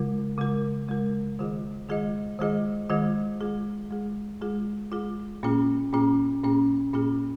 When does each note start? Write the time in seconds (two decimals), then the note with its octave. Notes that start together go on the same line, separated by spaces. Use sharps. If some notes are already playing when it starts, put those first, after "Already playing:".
Already playing: C#3 G#3 F4 A#4
0.38 C#3 G#3 F4 A#4
0.88 C#3 G#3 F4 A#4
1.39 D#3 G#3 F4 G#4 D#5
1.89 D#3 G#3 F4 G#4 D#5
2.39 D#3 G#3 F4 G#4 D#5
2.90 D#3 G#3 F4 G#4 D#5
3.41 G#3 F4 G#4
3.91 G#3 F4 G#4
4.41 G#3 F4 G#4
4.92 G#3 F4 G#4
5.43 A#2 A#3 C#4 F4 G#4
5.93 A#2 A#3 C#4 F4 G#4
6.43 A#2 A#3 C#4 F4 G#4
6.94 A#2 A#3 C#4 F4 G#4